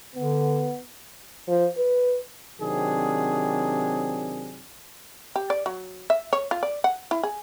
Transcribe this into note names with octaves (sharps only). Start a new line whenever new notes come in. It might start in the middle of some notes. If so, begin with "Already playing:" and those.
D3 B3
F3
B4
C3 D#3 F#3 C4 D4 G#4
G4
D5
F#3
E5
C#5
F4
D5
F#5
E4
G#4